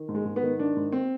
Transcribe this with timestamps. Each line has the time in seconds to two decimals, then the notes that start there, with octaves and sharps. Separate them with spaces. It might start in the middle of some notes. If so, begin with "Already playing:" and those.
Already playing: D#3
0.08 G#2
0.15 G#3
0.25 G#2
0.36 B3
0.42 D#3
0.59 D#3 D4
0.76 G#2
0.92 C4